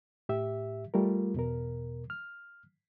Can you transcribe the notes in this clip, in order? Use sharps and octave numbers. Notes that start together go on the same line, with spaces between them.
A2 G4 E5
G3 A3 F4 A#4
E2 B2 A#4
F6